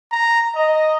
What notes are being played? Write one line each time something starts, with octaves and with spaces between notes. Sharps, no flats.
A#5
D#5